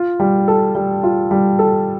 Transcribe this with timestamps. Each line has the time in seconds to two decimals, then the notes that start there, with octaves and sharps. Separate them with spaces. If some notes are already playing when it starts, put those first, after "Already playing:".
Already playing: F4
0.20 G3
0.48 A4
0.75 G3
1.03 F4
1.31 G3
1.59 A4